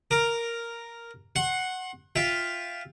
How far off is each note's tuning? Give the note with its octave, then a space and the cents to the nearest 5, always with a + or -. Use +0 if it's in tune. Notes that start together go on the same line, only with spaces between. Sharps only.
A#4 +0 D6 +15
F#5 +0 C6 +40
F4 +0 E5 +0 G5 +5